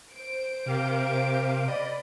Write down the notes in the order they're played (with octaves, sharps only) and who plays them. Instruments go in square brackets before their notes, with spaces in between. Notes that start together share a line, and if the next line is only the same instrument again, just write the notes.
[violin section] C5 D7
[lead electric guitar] C3 [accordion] G4 A#4 F5
[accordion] D5 B5 [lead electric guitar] D#5